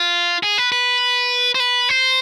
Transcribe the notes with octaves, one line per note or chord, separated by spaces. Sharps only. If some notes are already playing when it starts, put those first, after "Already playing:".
Already playing: F4
G#4
B4
B4
C5
B4
C5